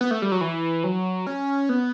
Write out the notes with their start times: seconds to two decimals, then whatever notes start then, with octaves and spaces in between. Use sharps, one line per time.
0.01 B3
0.11 A3
0.22 G3
0.32 F#3
0.41 E3
0.84 F#3
1.27 C#4
1.69 B3